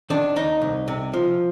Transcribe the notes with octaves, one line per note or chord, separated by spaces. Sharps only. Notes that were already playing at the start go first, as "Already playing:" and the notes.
D#3 D4
D#2 D#4
C2
C3
F3